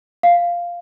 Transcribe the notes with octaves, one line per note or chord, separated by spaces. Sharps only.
F5